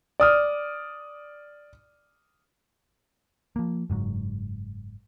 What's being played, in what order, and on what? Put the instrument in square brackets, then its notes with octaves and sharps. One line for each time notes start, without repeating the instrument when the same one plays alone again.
[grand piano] D5 D#6 F6
[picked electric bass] F3 A#3
F#1 G#2 C#3 F#3